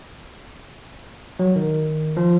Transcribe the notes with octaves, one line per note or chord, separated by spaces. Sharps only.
F#3
D#3
F3